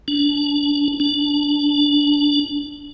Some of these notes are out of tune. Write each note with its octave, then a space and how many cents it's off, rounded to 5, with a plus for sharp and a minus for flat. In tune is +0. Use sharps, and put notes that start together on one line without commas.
D4 -25
D4 -15